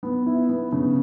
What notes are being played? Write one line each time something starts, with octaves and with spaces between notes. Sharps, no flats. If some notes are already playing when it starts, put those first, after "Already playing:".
B3
E4
B3
C#3